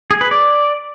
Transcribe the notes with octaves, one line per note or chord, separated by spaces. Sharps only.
G#4
B4
D5